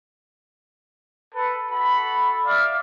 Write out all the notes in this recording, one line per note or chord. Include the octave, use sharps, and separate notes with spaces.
A4 B4
F#4 A4 B5
D5 E5 F5